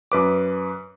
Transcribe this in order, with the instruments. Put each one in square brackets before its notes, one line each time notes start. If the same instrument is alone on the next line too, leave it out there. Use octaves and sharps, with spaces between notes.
[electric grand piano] F#2 B4 D6